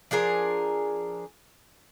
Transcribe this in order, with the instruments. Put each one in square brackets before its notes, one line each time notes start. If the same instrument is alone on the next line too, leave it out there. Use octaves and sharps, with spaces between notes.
[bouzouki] F3 D4 G#4 A#4